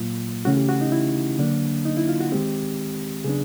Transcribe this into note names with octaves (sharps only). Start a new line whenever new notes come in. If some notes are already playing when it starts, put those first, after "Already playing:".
Already playing: A#2 F#3 A#3 F4
C#3 E3 A3 C#4 F#4
G4
F#4
D#4
E4
D3 F#3 A#3 D4
D#4
E4
F4
F#4
D#3 G#3 C4 G4
C#3 F#3 B3 D4 G#4